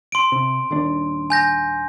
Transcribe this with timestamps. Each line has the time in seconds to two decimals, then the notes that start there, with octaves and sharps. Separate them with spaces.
0.12 C6 D7
0.32 C3
0.71 D#1 D#2 D4
1.30 G#5 G6 A#6